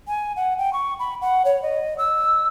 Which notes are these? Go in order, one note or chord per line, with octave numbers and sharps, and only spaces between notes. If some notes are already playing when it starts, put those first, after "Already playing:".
G#5
F#5
G5
C#6
B5
F#5
C#5
D#5
E6